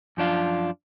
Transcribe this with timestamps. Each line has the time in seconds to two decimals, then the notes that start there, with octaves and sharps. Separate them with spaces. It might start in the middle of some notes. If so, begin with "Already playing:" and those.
0.17 F#2 F3 D4 F4